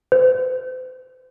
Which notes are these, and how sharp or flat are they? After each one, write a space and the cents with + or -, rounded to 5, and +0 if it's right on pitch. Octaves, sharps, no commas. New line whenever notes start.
C5 -40